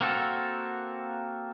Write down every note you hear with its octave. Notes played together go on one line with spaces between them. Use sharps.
A#3 C4 F#4 A4